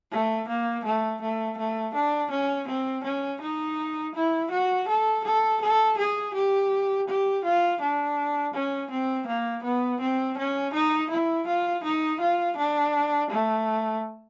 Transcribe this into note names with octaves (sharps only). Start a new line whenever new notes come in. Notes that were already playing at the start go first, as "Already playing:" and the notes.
A3
A#3
A3
A3
A3
D4
C#4
C4
C#4
D#4
E4
F#4
A4
A4
A4
G#4
G4
G4
F4
D4
C#4
C4
A#3
B3
C4
C#4
D#4
E4
F4
D#4
F4
D4
A3